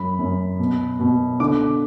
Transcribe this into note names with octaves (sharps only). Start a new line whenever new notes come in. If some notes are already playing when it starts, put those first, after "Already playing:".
Already playing: F#2 B5
F#2
B2
B2
D3 D6